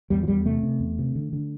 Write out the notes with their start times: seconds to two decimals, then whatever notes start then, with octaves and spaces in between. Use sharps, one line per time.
0.10 E2 G3
0.23 F3
0.28 E2 G3
0.46 C3 A3
0.63 C3
0.80 E2
0.98 C3
1.15 D3
1.33 D3